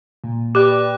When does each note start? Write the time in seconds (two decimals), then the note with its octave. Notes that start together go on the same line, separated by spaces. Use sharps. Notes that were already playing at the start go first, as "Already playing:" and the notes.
0.24 A#2
0.55 G4 B4 D5 D6 F#6